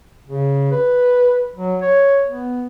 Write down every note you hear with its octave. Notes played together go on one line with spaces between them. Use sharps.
C#3
B4
F#3
C#5
B3